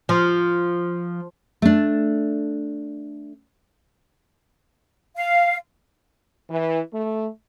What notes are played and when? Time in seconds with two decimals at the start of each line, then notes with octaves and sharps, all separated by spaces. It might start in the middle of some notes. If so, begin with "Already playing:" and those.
0.09 F3
1.62 A3 D4
5.16 F5
6.50 E3
6.93 A3